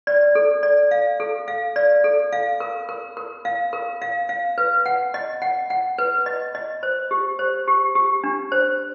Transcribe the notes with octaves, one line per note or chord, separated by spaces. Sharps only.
D5
A4
D5
F5
A4
F5
D5
A4
F5
A#4
A#4
A#4
F5
A#4
F5
F5
B4
F#5
D#5
F#5
F#5
B4
D#5
D#5
C5
G4
C5
G4
G4
D4
C5